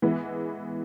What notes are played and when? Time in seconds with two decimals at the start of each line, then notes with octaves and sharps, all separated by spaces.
0.02 E3 G#3 B3 E4